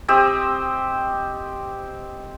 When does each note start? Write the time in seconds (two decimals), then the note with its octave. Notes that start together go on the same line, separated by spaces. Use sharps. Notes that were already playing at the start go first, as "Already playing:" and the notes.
0.08 C4 G4 D#5